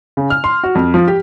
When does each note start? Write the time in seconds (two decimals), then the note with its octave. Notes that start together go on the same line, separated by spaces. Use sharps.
0.17 C#3
0.30 F6
0.44 C6
0.64 F#4
0.75 F2
0.94 F3
1.07 G4